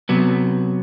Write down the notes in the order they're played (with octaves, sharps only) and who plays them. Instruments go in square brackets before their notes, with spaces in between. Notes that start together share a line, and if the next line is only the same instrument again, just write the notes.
[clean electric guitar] C3 F#3 B3